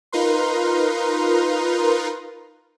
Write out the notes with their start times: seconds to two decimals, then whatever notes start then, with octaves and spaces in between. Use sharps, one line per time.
0.12 D#4 F4 A#4 B4 C6